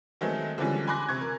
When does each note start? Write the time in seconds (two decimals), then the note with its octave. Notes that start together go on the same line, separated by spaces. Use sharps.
0.21 D#3 F#3 G#3 A3 B3 C4
0.58 D3 E3 F3 G3 G#3 C#4
0.87 G#5 B5 C6 D6 F#6 A#6
1.09 C3 C#6 G#6
1.21 A#4